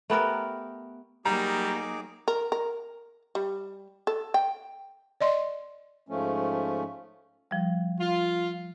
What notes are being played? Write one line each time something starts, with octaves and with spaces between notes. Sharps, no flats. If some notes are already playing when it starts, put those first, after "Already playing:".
A3 B3 G4 A#4
F#3 G3 A#3 D#4 G#4 A#5 D6
A#4
A#4
G3
A4
G5
D5 D#5 C6
G#2 F3 A3 C#4
F3 G3
F4